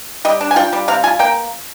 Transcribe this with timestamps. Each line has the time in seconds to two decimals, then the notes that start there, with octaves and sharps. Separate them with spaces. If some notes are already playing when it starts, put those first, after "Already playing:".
0.25 G3 D#5
0.41 D4
0.51 G#5
0.56 F4 G5
0.73 G3
0.88 C3 F5
1.04 F4 G#5
1.19 A#3 G5